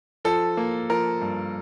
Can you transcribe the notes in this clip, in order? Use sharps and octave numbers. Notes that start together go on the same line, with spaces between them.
F3 A4
A#3
F3 A#4
G2